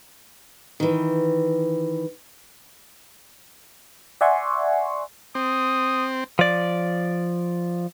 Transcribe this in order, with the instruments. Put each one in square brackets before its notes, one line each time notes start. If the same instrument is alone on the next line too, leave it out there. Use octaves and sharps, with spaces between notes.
[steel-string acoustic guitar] D#3 E3
[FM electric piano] D5 E5 F#5 G#5 C6 C#6
[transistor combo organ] C4 [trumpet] D#6
[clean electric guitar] F3 D5